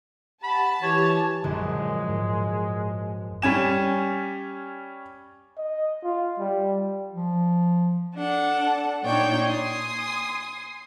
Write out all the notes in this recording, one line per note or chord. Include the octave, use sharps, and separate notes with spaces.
G4 F#5 A5 B5
E3 G4 C#5
A#1 F#2 D3 G#3
G#2
G3 C#4 G#5 E7
D#5
F4
G3
F3
D4 A4 F#5
A#2 D4 D#4 C#5 G5 G6
G#5 C6 D#6